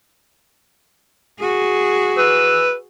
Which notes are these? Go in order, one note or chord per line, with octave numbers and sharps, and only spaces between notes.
F#4 G#4
B4 E6